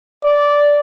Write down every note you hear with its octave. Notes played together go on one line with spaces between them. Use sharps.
D5